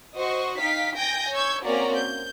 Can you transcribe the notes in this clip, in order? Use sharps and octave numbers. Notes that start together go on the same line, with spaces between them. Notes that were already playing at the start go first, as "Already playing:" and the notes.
F#4 C5 D#5 C#6
D#4 F5 G5 B6
G5 G#5 G6 A#6
C#5 C#6 E6 G6 G#6
A#3 C4 C#4 F#4 D5 A#5
G6